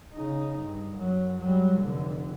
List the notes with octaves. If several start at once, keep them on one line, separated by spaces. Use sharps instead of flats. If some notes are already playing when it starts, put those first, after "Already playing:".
C#3 D#4
G2
F#2 F#3
F#3 G3
F1 D3